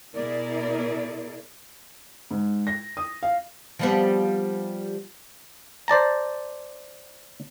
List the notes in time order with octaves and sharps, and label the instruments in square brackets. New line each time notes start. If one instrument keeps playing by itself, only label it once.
[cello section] B2 E4 G#4 A#4 D5
[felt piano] G#2
A#6
D#6
F5
[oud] F3 G3 B3
[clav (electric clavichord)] C5 D5 A5 A#5